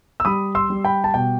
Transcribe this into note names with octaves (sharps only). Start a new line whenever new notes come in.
E6
G3 B5 D#6
C6 E6
G3
G5 B5
A5
B2 G5